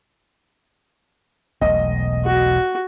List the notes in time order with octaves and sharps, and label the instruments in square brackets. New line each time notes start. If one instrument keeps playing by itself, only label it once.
[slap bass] E1 B1 A3 [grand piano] D#5
[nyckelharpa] F#4